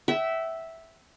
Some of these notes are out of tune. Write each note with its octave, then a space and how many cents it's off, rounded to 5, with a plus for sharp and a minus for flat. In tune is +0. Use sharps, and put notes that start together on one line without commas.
E5 -5 G5 -45